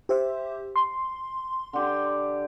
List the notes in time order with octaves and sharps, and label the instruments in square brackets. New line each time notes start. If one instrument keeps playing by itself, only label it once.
[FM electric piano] G4 C5 E5
C6
[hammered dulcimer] D3 G4